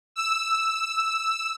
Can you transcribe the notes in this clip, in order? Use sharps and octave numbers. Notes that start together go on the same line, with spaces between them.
E6